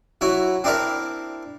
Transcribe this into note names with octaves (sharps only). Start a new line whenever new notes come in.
F#3 E4 F#4
C4 D4 E4 A#4